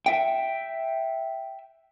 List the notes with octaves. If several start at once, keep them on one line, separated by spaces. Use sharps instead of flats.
E5 G5